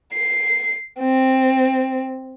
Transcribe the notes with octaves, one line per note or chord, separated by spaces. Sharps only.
C7
C4